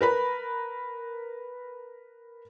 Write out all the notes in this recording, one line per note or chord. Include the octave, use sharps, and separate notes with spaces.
A#4 B4 B5